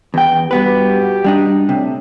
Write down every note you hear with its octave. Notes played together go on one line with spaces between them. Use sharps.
E2 G5
G2 B2 B3 F#4 G4 B4
G3 D4 D#4
A2 C3 D4